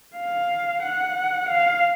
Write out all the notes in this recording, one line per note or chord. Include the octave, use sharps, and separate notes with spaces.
F5
F#5
F5